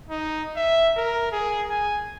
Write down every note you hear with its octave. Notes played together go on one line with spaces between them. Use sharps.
D#4
E5
A#4
G#4
G#5